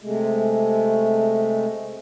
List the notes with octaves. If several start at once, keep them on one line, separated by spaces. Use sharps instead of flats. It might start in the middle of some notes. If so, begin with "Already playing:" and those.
C3 G#3 A3